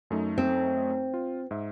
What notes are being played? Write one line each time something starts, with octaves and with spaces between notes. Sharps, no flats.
F#2 A3 D#4
C4
F4
G#2 E5